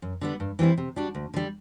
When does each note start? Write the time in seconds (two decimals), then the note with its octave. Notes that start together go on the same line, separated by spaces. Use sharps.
0.02 F#2
0.21 D3 G3 B3
0.40 G2
0.59 E3 G3 C4 E4
0.78 C3
0.96 G3 D4 F#4
1.15 D2
1.34 D3 G3